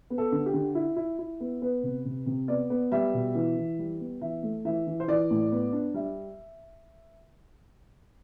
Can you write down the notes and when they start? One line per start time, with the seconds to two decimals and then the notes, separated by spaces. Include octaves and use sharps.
0.10 B3
0.18 A4
0.32 D3
0.46 G4
0.54 D3
0.75 E4
0.96 E4
1.19 E4
1.40 B3
1.62 B3 B4
1.83 C3
2.05 C3
2.26 C3
2.48 B3 D5
2.70 B3
2.92 G3 E5
3.14 B2
3.35 E3
3.57 E3
3.79 G3
4.00 B3
4.21 E3 E5
4.43 A3
4.65 E3 E5
4.87 E3
5.00 C5
5.08 E3 D5
5.31 A2
5.52 B3
5.73 D4
5.94 G3 E5